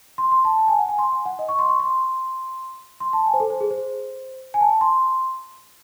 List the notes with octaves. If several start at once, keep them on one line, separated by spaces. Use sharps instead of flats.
C6
C6
A5
A5
G#5
F#5
G#5
C6
G#5
F#5
D#5
C#6
C6
C#6
C6
C6
A5
G#5
C5
A4
C5
G#4
C5
G#5
A5
C6